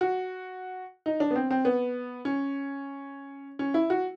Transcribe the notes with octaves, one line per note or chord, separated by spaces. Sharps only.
F#4
D#4
D4
B3
C4
C4
B3
C#4
C#4
E4
F#4